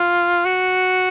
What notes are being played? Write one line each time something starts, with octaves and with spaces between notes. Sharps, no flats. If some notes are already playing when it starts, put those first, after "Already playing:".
Already playing: F4
F#4